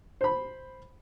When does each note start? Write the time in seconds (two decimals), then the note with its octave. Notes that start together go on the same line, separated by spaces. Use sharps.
0.21 C5 B5